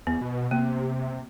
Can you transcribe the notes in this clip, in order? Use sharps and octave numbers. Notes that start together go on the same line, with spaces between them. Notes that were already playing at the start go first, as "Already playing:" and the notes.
E2 B3
B2
C3 A#3